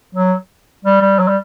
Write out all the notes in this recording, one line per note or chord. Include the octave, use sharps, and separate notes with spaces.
F#3
G3
G3
F#3
G3